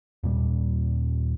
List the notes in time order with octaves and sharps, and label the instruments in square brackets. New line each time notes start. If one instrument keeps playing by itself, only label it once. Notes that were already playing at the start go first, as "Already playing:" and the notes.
[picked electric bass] D#2 A#2 G3